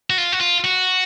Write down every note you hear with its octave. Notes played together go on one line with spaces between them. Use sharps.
F#4
F4
F#4
F4
F#4